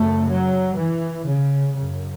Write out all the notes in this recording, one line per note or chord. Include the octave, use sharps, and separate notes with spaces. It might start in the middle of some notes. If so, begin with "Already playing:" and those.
Already playing: F#2 C#3 A3
F#3
E3
C#3
F#2 C#3